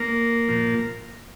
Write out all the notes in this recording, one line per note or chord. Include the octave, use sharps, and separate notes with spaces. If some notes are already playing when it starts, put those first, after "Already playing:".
Already playing: A#3
A#2 F3